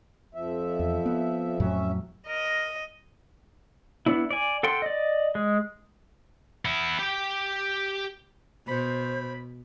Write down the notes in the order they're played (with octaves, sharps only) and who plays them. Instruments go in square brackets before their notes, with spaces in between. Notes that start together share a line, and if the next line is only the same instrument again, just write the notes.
[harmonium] F2 F3 E5
[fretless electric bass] E2
B3
[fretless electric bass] F2 A2 F#3 [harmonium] C#4 E5
[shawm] A#4 [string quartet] D#5
[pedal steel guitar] B3 D4 E4
D5 G#5
A4 F#5 G5 C6
D5 D#5
G#3
[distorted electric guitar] B3 E4
G4 G5
[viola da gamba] B2 [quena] C5 [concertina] B5